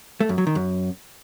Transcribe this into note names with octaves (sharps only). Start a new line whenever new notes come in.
A3
F#2
F#3
D#3
F#2